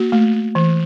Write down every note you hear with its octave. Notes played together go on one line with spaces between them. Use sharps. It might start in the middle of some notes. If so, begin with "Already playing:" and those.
Already playing: A#3 F#4
A3
E3